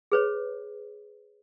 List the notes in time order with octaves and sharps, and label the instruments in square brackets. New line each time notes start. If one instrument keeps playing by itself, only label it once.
[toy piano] G#4 B4 C#5